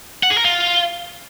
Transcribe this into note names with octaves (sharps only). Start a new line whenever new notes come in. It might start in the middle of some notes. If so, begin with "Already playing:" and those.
F#5
G#4
A#4
F4